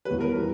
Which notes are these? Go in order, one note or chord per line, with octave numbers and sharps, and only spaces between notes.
E2 B2 G3 B4
A#4
E3 G3